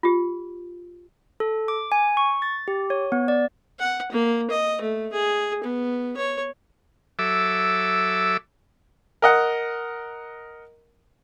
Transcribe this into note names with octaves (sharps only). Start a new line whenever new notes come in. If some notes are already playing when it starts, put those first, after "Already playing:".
F4 G4
A4
D6
G#5
C#6
A6
G4
C#5
B3
D5
F#5
A#3
D#5
A3
G#4
B3
C#5
F#3 A4 E5 D6 E6
A#4 D#5 F#5